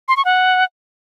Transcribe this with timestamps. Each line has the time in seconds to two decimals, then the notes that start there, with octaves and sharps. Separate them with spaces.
0.08 C6
0.17 C#6
0.25 F#5